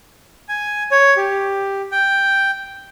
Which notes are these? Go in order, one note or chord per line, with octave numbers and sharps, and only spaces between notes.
G#5
C#5
G4
G5